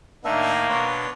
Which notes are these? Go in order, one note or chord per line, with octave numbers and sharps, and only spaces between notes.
A2 D#3 A#3 D4 D#4 E5
B2 D4 B4 C#5 C6